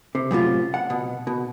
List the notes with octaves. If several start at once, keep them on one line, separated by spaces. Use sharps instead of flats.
C3
F#2 A2 C3 F4
F#5
B2
B2